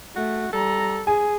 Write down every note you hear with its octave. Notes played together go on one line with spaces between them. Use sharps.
A3 F#4
G3 A4 A#5
G#4 G#5